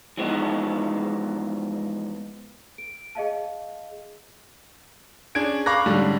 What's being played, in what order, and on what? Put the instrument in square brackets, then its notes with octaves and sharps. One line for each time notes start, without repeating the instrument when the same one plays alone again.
[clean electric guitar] E3 F3 G#3 B3 D#4
[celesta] D7
G#4 D#5 F5 A5
[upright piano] C#4 D4 G#4 G#6 D7
F5 B5 C#6 D6 F#6 A#6
G#2 D3 G3 C#4